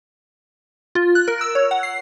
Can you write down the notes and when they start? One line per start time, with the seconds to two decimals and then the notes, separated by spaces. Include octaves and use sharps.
0.95 F4
1.15 F#6
1.28 A#4
1.41 E6
1.55 C#5
1.71 F#5
1.83 C7